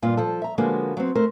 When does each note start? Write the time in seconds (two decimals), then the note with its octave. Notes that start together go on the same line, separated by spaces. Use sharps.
0.02 G2 A#2 F4
0.17 F3 A4
0.42 E5 A#5
0.58 D3 F3 G#3 A#3 B3 F#4
0.97 F#3 B3 C4
1.15 A3 A#4 C5